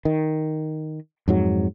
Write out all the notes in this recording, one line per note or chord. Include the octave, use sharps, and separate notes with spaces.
D#3
F2 G#2 F#3